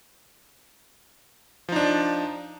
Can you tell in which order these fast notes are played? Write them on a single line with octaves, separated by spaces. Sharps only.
F3 D#4 D4